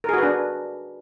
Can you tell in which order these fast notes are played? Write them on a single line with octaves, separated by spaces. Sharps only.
A#4 G#4 F#4 B4 D4